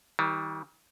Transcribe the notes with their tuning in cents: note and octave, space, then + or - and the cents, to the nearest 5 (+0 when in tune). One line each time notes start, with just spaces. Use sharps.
D#3 +45 G3 +0